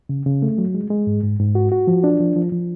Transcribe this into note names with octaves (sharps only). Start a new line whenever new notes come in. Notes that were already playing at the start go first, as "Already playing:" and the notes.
C#3
C#3
A3
F#3
G#3
G#3
G#2
G#2
G#2
F#4
F#4
F3
D4
F3
F3
F3